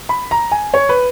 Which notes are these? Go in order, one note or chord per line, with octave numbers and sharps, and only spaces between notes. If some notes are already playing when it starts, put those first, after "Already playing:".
B5
A#5
G#5
C#5
B4